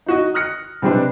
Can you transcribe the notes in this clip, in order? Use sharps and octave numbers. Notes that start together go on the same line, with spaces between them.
D#4 F#4 D#5
D#6 F6 F#6 A#6 C#7
C3 G3 G#3 C4 D4 B4